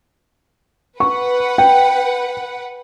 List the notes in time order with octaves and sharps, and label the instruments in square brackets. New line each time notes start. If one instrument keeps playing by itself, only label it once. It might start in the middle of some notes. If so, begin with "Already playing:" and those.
[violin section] B4 F#5 [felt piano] C#6
[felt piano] G5